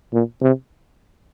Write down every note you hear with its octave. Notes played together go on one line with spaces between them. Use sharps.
A#2
C3